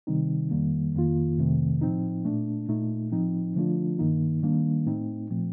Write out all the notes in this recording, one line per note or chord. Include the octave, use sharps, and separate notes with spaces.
C3 D#3 G3 C4 D#4
F2 D#3 G3 A#3
F2 D#3 A#3 F4
F2 C3 D#3 A3 C4
A2 F3 C4 D#4
A#2 A3 D4
A#2 A3 D#4
A2 F3 C4 D#4
D3 F3 A3 D4 F4
G2 D#3 A#3 D#4
D#3 G3 A#3 D4
A2 A3 C4 D#4
A#2 F3 A3 C4